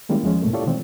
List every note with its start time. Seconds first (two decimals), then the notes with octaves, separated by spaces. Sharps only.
0.09 D#3 G3 G#3 A#3 C#4 E4
0.23 E2 F3 G#3 C#4
0.41 G#2 B2 A3 A#3
0.53 E4 F4 G4 A4 C#5 D5
0.65 B2 D#3 E3 G#3 C4